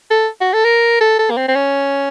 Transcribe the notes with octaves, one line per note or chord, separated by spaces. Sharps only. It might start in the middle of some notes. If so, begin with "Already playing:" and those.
A4
F#4
A4
A#4
A4
A4
A#3
C4
C4
C#4